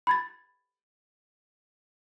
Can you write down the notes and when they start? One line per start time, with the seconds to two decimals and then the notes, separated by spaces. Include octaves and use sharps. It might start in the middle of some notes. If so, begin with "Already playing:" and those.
0.07 B5 G#6 A6